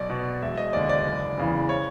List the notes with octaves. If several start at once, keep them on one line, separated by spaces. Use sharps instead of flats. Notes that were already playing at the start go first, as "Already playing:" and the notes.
Already playing: B1 D5
B2
E1 E5
D#5
D#2 D3 D5
D5
F#1
E2 C#3 E3
C#5